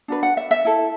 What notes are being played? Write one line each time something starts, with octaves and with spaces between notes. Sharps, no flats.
D4 F#4 B4
F#5
E5
E5
E4 A4